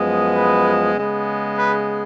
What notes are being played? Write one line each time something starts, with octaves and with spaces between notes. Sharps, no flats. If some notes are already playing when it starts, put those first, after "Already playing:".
Already playing: F#2 F3 G#3 B3
B4
C#3 G#3 B3
B4